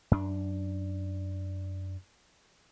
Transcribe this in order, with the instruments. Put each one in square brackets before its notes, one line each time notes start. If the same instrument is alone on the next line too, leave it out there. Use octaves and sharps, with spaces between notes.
[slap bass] F#2 D4